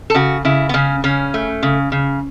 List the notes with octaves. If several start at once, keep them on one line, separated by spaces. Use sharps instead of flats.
A4
C#3 F#4
C#3 E4
B3
C#3 C#4
C#3 C#4
A3
C#3
C#3